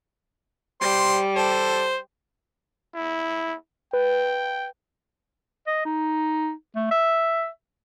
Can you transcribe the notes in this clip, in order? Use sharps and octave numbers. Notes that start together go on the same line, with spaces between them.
G3 C5 C6
A4 C5
E4
B4 G5
D#5
D#4
A3
E5